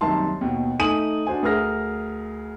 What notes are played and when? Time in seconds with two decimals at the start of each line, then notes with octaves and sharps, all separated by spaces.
0.01 C2 F#2 D#3 A#3 A5 C6
0.41 D#2 B2
0.79 A3 D#4 G#5 D#6 D#7 F#7
1.27 D4 F#4 C5 G#5
1.43 D2 G#4 A#4 F6 A#6